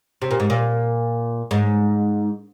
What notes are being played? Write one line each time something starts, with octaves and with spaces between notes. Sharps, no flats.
C3
A#2
G#2
A#2
G#2